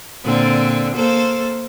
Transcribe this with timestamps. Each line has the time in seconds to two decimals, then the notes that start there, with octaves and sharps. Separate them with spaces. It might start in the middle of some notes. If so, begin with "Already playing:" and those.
0.24 A#2 D3 C4
0.96 A#3 A4 C5